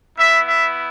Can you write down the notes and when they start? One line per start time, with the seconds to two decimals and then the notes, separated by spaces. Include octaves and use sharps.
0.18 B3 E4 E5
0.46 E5